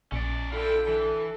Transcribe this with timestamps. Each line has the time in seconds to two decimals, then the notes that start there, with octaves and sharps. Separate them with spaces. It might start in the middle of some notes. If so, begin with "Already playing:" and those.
0.12 A#1 C#4 D5
0.52 D3 E4 F4 A4 G5
0.88 E3 A4